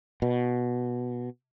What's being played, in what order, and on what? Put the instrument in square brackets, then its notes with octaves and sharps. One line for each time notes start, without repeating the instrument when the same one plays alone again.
[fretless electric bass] B2